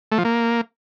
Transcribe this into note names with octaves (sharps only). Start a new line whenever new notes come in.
A3
F3
A#3